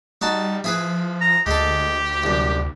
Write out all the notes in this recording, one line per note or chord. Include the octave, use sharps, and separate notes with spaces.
G3 D#4 F#4 A5
F3 E4 G#4 B4
A#5
D2 G#3 G4 A4
C2 F#2